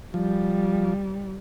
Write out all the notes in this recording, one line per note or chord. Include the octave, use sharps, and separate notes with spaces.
F3 G3